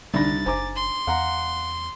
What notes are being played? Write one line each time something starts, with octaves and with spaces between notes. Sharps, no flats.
C2 D3 D4 D#4 D5 B5 A6 A#6
F#1 C5 G#5 A#5 D6
C6
E2 F5 F#5 A#5